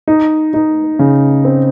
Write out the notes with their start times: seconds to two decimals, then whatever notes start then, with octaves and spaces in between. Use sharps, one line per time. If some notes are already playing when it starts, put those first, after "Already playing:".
0.08 D#4
0.54 D#4
0.99 C#3
1.45 C4